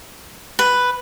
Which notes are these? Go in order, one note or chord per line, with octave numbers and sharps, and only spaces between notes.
B4